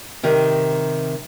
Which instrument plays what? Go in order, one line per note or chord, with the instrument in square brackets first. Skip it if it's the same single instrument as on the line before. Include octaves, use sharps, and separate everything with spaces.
[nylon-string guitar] C3 D#3 D#4